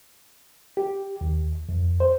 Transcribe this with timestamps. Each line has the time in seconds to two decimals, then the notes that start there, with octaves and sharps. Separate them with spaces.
0.77 G4
1.21 D#2
1.69 F2
2.00 C5